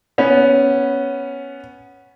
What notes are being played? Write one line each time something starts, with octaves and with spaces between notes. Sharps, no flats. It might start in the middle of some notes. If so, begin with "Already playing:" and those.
B3 C#4